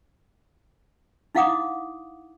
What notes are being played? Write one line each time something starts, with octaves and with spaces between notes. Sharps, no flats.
D#4 E4 F5 F#5 D6 D#6